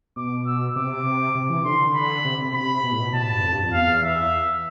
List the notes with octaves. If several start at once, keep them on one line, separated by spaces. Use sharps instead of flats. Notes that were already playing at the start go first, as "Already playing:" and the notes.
B2 D6
E6
C3 D6
C3
E3
D3 C6
B5
C3
C3
C3 B5
B2
A2
B2
B2 A5
A2
G2
F2
G2
F2
E2 F5
E5